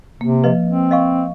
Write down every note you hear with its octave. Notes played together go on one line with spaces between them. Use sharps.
C3 A#3
F3 B4 D#5
C4
D#5 F5 C#6